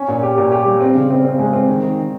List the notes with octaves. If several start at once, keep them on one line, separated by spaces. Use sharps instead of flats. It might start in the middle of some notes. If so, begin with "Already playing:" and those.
Already playing: C#4
A#2
G4
A#2
G4
G3
C4
C#3
C4
C4
G#3
C4
D#3
D#3
D#3